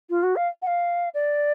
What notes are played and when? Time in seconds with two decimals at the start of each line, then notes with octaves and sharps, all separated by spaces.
0.10 F4
0.23 F#4
0.36 F5
0.62 F#5
0.67 F5
1.14 D5